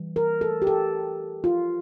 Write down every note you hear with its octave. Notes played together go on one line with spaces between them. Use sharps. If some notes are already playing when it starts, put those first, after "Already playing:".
Already playing: E3 G3
A#4
A4
G4
A4
F4